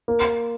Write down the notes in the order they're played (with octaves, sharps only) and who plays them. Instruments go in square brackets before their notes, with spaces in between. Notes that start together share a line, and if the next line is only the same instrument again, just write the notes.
[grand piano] A#3